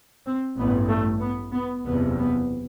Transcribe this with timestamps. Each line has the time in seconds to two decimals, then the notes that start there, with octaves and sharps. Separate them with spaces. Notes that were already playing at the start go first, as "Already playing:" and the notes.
0.26 C4
0.58 A1 G2 B3
0.89 A3
1.22 B3
1.53 B3
1.85 F#1 E2 C3 B3
2.18 B3